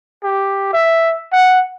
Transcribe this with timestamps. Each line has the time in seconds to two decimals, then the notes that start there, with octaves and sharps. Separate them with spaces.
0.24 G4
0.73 E5
1.33 F#5